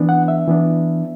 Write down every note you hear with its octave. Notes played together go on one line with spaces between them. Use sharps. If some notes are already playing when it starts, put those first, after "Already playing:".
Already playing: E3 B3 D4
F#5
E5
E3 B3 D4